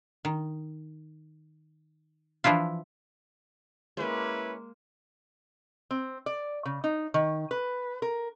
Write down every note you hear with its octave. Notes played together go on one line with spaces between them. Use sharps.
D#3
E3 F3 D4 E4 F4
G#3 A#3 C#4 E4 B4
C4
D5
C#3
D#4
D#3
B4
A#4